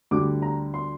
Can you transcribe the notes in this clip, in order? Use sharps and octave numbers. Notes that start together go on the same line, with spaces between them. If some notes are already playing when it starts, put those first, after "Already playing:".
D2 D3 G3 D6
A#5
C6